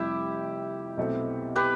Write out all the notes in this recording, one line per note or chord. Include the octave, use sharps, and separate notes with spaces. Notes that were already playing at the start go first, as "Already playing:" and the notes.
Already playing: F1 F2 C3 G3 E4 G4
B1 B2 A3 C4
G4 B4